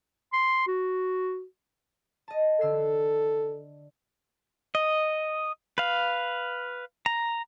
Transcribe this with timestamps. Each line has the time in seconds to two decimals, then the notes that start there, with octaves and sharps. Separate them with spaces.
0.33 C6
0.67 F#4
2.28 D#5 A5
2.61 D3 A4 E6 C7
4.75 D#5
5.78 B4 F5
7.06 A#5